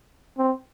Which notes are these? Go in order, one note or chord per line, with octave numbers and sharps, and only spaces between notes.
C4